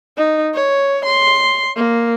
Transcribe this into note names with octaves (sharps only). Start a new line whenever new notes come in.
D#4
C#5
C6
A#3